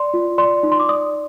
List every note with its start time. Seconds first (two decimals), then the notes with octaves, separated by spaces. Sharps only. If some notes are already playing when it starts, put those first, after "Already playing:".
Already playing: D5 C6
0.14 F4
0.38 D5 C6
0.63 D#4
0.72 C6
0.79 D6
0.89 D5 D#6